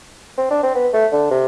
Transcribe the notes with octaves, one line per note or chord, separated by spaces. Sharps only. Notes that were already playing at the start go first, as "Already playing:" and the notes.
C4
D4
C4
B3
A3
D3
C3